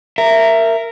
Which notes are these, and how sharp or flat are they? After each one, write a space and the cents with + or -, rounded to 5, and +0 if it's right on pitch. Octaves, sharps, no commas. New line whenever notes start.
A#4 -10 E5 +15